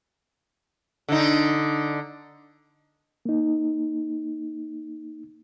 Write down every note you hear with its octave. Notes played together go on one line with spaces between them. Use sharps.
D3 D#4
A#3 D#4